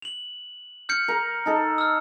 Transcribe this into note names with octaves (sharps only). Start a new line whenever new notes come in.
F7 F#7
F6 G6 C#7
A#4
D#4 A4
E6 F6